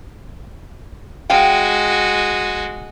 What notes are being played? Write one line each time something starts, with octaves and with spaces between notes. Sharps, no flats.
G#3 F#4 F5 G5